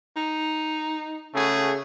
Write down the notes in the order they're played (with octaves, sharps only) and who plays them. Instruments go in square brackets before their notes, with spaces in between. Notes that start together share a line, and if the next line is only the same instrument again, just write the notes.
[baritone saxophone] D#4
[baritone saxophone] C#3 [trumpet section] A3 F#4 G#4